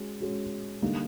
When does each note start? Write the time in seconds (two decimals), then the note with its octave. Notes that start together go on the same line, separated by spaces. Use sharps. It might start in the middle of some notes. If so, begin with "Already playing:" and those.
Already playing: G#3 C#4 F#4
0.20 G#3 C#4 F#4
0.82 D3 G3 A#3 D#4 G4